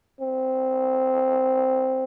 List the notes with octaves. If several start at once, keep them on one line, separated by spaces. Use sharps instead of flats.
C4